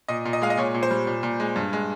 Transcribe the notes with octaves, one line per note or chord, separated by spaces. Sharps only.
A#2 D#5
A#2
D#5
G#3 F5
D#5
A#2 C#5
A#2
C5
G3
A#2
A#2
G#3
G2
G#3